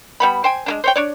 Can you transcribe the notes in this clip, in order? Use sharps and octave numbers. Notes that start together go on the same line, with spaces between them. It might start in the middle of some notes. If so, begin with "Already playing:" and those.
G3 B3 B5
C5 G5 G#5
G#3 A#3 D4
C5 C#5 G5
D4 C#5 D5